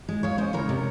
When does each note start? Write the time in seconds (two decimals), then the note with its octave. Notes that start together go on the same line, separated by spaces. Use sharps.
0.09 G#3
0.23 G#3 C#5 F5
0.38 C#3 C5 D#5
0.53 C#3 A#4 C#5
0.69 C3